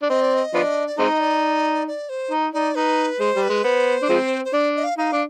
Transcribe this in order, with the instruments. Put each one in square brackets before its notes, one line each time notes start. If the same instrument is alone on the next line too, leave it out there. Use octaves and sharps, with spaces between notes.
[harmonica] D4
[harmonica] C4 [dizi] D#5
[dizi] D5
D#5
[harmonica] F3 B3 D4
[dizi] D5
[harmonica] G#3 C4 D#4 [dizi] D#5
[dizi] D5
D5
C5
[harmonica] D#4
[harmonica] D#4 [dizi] D5
[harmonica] D#4 [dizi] B4
[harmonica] G#3 [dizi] C5
[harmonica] G3
[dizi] B4
[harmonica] G#3
[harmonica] B3 [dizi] C5
[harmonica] D4
F3 G#3 C4
[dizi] C5
[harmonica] D4 [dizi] D5
[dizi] D#5
F5
[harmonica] D#4 [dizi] F5
[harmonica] D4